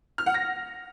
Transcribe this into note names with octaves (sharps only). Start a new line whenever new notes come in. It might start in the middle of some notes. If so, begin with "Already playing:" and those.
F6
F#5
A#6